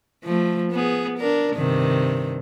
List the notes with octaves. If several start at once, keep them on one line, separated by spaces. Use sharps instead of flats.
F3 A3
B3 G#4
D4 A#4
G2 C3 D#3